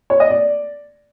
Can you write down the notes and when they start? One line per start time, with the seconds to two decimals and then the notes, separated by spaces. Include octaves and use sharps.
0.10 C#5
0.20 D#5
0.30 D5